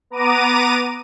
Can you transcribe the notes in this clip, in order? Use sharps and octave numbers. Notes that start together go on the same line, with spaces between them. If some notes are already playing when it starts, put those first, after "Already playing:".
B3 A#5 D6 D#7